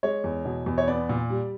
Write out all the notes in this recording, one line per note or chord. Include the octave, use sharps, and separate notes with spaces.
G#3 C#5
E2
B2
E2
C#5
B3 D5
A#2
G3